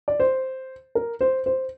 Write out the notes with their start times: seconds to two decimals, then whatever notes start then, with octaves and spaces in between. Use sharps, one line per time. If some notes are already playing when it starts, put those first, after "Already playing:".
0.08 D5
0.20 C5
0.95 A#4
1.21 C5
1.46 C5